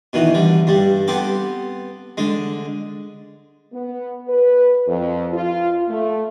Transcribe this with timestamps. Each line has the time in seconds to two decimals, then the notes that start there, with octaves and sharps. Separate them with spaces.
0.13 B2 D#3 E3
0.34 D3 G3
0.67 G2 G3
1.08 B3 C4 G4 A4
2.17 D3 G#3
3.73 B3
4.28 B4
4.88 F2
5.33 F4
5.89 A3